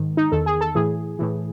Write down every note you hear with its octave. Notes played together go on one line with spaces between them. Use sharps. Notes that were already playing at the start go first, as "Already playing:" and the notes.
Already playing: G#2 D#3
D#4
E2 D#3 A4
G#4
A4
A2 E3 G#4
A2 E3